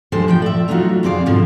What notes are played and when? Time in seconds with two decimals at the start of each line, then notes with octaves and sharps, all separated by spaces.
0.12 F3 G#3 D4 G4 A4 C5
0.28 A2 E3 F3 G5
0.42 D5 E5
0.68 F#3 A3 D4 D#4 F4 F#4
1.03 F2 B2 C4 G#4 D5 F5
1.26 G#2 B2 D3 F3 G#3